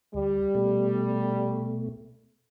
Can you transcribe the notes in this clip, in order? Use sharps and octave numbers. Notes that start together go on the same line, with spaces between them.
D2 G3
B2 A3